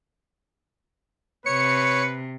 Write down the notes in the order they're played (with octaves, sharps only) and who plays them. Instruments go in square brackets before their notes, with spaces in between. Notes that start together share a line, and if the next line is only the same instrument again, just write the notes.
[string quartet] C3 [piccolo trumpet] B4 [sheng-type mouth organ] C#5 [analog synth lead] C#7